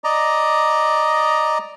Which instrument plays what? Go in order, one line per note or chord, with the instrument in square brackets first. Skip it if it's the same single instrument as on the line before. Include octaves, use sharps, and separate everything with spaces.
[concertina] D5 D#5 A#5